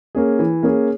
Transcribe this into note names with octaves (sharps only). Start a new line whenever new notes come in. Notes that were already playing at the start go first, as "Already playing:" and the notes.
A#3 C#4 G#4
E3
A#3 C#4 G#4